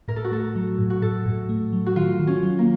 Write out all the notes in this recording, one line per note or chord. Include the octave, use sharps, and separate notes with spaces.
A2 A#4
A4
F#4
A3 A4
F#3
A2
F#4
A2 A4
A2
A3
F#3
F#4
D#3 F4
D#3
C#4
F#3
A#3